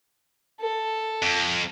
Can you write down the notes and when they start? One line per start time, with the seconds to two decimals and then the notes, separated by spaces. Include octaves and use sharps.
0.60 A4
1.22 F2